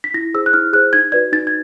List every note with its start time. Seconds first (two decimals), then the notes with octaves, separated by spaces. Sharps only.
0.04 B6
0.14 E4 A#6
0.34 G#4 C5 E6
0.46 F#6
0.53 E4 F6
0.73 G#4 C5 F#6
0.93 D#4 G#6
1.12 F#4 B4 D5 G#6
1.32 D#4 A6
1.47 G#6